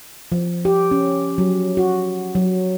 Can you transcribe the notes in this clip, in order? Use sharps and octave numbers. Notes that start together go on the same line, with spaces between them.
F3
G4
C#4
F#3
F#4
F#3